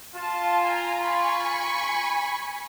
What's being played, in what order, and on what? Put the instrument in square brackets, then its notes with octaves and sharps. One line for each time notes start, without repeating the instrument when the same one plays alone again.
[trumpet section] F4 [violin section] A5
[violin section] G#5 A#5
G#5 B5 C#6